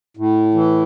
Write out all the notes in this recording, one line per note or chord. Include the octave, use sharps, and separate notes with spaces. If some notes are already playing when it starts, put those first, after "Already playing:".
A2
E3